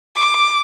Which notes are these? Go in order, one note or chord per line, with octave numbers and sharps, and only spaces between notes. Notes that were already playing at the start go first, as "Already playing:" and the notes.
D6